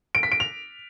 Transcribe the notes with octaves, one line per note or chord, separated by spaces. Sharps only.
D7
B6
D7
F7